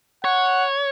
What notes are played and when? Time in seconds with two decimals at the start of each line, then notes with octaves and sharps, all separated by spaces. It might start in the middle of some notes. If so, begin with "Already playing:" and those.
0.24 C#5 F#5